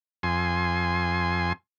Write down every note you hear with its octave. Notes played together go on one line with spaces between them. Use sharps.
F2 G#5 C6